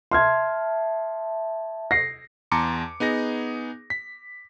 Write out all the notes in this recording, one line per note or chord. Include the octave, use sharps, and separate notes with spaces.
E5 A5 C6 F6 G#6
A#6 C7
E2 A5 A#5 C6 D6 C#7
B3 D#4 G#4 A#6
B6